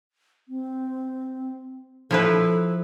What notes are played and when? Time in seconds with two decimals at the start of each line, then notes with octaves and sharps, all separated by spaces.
0.48 C4
2.11 F3 E4 A4 B4